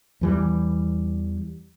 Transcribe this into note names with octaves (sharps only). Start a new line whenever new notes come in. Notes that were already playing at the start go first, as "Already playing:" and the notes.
E2 E3 G3